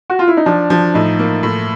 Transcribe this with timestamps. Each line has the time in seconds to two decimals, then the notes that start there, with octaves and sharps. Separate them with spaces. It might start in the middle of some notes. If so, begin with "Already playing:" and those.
0.10 F#4
0.19 F4
0.28 E4
0.37 D#4
0.46 F3 D4
0.70 F3 D4
0.94 A2 D#4
1.19 A#3
1.43 A2